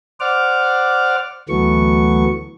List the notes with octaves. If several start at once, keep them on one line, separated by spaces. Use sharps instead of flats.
C5 D5 F#5 D6 F6
D2 E3 F#3 A3 B3 C#6